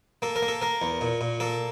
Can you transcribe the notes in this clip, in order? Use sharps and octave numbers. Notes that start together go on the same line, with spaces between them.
A#3 A4
A#4
A#3
A4
A#3 A#4
E2
A#2
A#2
A#3 A4